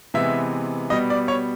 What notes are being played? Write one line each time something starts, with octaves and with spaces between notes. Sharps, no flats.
C3 E3 G#3 B3 E5
B2 G3 B3 D#5
D5
C#5